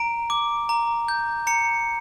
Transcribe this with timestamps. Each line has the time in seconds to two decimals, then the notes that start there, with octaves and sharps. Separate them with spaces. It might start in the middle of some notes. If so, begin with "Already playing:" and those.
Already playing: A#5 D7
0.30 D6
0.69 A#5
1.08 G6
1.47 A#5 C#7